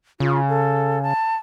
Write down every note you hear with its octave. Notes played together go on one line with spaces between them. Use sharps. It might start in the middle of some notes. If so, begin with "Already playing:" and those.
C#3 F4
A4
A5